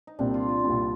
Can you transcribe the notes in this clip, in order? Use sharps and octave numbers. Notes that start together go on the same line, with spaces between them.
D#4
C2 A#2 G3 C4 D4
F4
F4
C2 A#2 G3 C4 D4